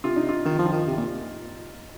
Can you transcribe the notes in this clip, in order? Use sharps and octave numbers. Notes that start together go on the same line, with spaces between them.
C3 F4
D#4
F4
D#3 F4
F3
F4
D#3
C3
A#2